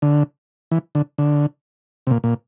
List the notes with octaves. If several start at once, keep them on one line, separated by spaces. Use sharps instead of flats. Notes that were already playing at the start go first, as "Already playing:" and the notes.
D3
E3
D3
D3
C3
A#2
A#2